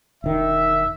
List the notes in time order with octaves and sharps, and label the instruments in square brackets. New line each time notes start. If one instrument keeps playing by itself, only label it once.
[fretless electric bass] E1 D#3 [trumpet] E5